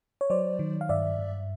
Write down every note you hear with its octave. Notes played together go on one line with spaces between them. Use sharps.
C#5
F#3 C5 D5
D#3
F5
G2 D5 E5
G2